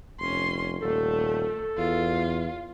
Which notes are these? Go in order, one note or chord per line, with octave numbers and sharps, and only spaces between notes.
F1 C#4 C6
D#1 A3 A4
E2 F4